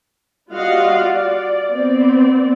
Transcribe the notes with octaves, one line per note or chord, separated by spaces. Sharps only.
G3 F4 F#4 D#5 F5 F#5
D5
B3 C4 D5